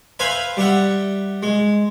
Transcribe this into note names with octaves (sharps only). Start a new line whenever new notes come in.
B4 C5 E5 F5 G#5 B5
G3 E5 F#5
G#3